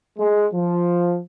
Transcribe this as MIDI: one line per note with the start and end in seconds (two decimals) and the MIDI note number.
0.18 0.46 56
0.53 1.19 53